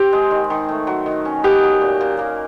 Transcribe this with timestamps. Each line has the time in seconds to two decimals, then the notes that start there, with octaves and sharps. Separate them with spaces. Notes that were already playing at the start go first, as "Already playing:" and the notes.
Already playing: C4 G4
0.13 G#3
0.31 D#3
0.50 D#3
0.69 A3
0.87 F#3
1.06 D#3
1.25 C#4
1.44 B3 G4
1.63 F#3
1.81 A#2
2.01 A#2
2.19 A#3